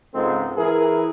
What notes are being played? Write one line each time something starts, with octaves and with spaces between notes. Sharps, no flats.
C#2 G#2 G#3 C4 A4
E3 E4 G#4 A#4